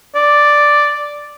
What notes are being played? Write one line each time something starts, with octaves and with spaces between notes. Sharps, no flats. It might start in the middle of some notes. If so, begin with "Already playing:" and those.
D5